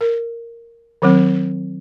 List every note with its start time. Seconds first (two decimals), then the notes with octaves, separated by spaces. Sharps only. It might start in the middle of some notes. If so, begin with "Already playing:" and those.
0.01 A#4
1.02 D#3 F#3 C4